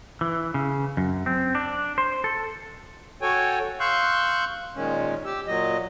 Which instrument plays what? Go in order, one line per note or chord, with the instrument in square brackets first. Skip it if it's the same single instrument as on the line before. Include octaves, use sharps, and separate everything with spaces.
[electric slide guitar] E3
C#3
F#2
C4
D4
C5
A4
[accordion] F#4 A4 C#5 G5 G#5
F5 C6 C#6 E6 F#6 G6
A#2 D#3 G#3 C#4
G4 E6
A#2 F#3 D#5